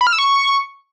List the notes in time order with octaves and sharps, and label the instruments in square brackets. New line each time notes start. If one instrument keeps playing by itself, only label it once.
[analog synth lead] B5
F6
E6
C#6